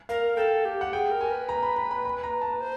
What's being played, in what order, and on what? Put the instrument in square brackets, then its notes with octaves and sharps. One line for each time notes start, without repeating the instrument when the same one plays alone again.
[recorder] A#4 [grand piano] F5
[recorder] A4 [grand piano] G5
[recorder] G4
[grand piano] F#5
[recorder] G#4 [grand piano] G5
[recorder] A#4
[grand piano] G#5
[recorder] B4
[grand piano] A#5
B5
B5
B5
B5
A#5
A5
[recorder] C5